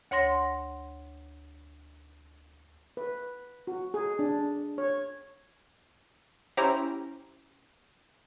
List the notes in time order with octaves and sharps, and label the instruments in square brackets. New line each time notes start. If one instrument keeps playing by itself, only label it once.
[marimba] D2 C#5 F#5 C6 A#6
[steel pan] B4
F#4
G#4
D4
C#5
[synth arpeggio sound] C#4 E4 G4 C5 G5 A#5